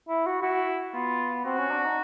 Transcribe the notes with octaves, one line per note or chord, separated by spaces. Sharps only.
E4
F#4
E4 F#4
B3 F4
C4 F#4
C#4
D4
D#4